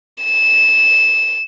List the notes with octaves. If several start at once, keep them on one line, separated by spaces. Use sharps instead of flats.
E7